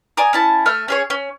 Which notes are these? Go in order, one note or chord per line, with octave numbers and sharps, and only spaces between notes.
D5 G#5 A#5 D#6
C#4 E4 A5
A3 E5 F6
C#4 G#4 C#5
C#4